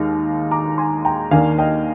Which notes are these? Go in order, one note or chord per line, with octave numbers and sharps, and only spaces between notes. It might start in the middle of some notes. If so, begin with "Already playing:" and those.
Already playing: D#2 D#3 G#3 D#4 F5
A#5 D6
G#5 C6
G5 A#5
D#2 D#3 A#3 D4 F5 G#5
D#5 G5